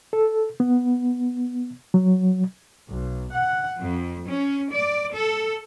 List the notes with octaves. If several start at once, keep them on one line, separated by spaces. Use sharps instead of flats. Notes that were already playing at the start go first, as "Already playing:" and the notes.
A4
B3
F#3
B1
F#5
F2
C#4
D5
A4